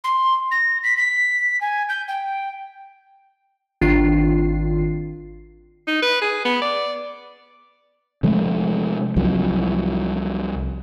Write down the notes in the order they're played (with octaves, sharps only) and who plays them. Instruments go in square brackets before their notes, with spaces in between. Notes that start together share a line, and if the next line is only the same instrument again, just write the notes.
[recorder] C6
A#6
B6
B6
G#5
G6
G5
[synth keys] G#1 D#3 D4 F4 C7
[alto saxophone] D#4
B4
G#4
B3
D5
[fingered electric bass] C3 F3 G#3 A3
C2 F3 F#3